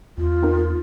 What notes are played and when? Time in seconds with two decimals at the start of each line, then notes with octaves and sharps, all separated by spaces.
0.18 E2 F4
0.43 C4 D#4 A#4